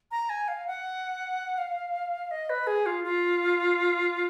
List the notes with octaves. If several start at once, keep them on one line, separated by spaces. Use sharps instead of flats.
A#5
G#5
F5
F#5
F5
D#5
B4
G#4
F4
F4